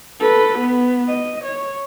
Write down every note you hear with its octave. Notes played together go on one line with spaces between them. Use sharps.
A4 B4
B3
D#5
C#5